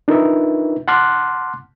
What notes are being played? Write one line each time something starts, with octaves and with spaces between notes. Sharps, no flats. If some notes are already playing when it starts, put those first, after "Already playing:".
D4 D#4 F4 A#4 B4 E5
F#5 A5 C6 D6 F6 F#6